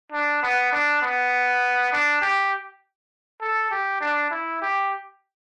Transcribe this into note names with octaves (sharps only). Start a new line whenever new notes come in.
D4
B3
D4
B3
D4
G4
A4
G4
D4
E4
G4